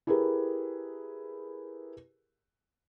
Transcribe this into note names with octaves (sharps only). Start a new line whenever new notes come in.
E4 G4 G#4 A#4 B4